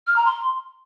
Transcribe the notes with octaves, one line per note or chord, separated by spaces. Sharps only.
F6
A#5
C6